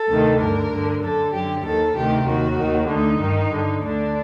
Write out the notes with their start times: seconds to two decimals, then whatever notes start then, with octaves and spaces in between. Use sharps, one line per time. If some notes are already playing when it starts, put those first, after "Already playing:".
Already playing: A4
0.08 D2 C3 D#3
0.39 G2 D3 A#4
0.70 G2 D3
1.01 F#2 D3 A4
1.32 F#2 G4
1.38 D3
1.65 D#2 D#3 A4
1.96 D2 C3 D#3 G4
2.26 D#2 D#3 F#4
2.58 D#2 D#3
2.89 D2 D3 D#4
3.20 G2 D#3
3.51 G2 D3
3.82 D2 D3 D4